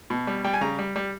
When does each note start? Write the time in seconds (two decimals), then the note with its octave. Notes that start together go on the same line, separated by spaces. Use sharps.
0.10 B2
0.27 G3
0.44 G3 G5
0.53 G#5
0.61 C#3 A#5
0.79 G3
0.96 G3